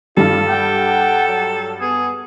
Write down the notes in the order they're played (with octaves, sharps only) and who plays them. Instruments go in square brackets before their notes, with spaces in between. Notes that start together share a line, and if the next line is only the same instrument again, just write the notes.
[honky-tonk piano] G2 G3 [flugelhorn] F4 [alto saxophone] A4
[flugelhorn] F#5 [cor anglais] G5
[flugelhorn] F#3
[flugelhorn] B3 [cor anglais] G#4